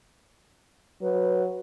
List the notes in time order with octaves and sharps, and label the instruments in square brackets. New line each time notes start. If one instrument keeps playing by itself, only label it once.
[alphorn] F#3 [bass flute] B4